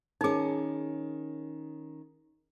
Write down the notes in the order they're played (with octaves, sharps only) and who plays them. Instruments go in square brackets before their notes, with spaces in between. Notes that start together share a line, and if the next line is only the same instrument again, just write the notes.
[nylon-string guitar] D#3 C#4 [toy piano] D#4 G#4